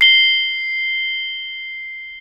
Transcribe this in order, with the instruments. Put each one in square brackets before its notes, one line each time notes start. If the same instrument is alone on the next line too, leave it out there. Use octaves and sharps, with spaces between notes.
[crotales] C7 G7